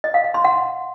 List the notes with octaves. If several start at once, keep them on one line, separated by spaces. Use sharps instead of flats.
D#5
F5
F5
C6
F#5